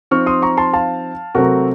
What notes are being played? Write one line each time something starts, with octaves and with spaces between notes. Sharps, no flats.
F3 C4 D#4 C#6 F6
C6 D#6
A#5 C#6
A5 C6
F5 A5
C3 F#3 A3 C4 F#4 A#4